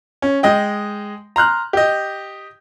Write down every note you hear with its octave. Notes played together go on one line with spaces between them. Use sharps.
C#4
G#3 D#5 G5
A#5 C6 F6 F#6
G4 D#5